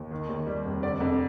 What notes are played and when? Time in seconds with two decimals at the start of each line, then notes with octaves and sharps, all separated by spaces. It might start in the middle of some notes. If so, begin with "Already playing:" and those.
Already playing: D#2
0.11 D#3
0.29 D#2
0.47 G3
0.65 F1
0.83 D3 D5
1.00 F2